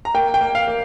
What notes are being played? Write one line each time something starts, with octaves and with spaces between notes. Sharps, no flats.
A#5
A#3 G5
G5
A#3
F5
A#3